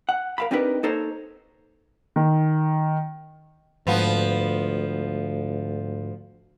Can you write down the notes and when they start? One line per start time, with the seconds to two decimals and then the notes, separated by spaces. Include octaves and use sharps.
0.09 F#5
0.38 A#4 F5 B5
0.51 C4 D4 D#4 G4 A#4 B4
0.83 A#3 D#4 A4 A#4 C5 C#5
2.16 D#3
3.87 D2 G#2 F3 B3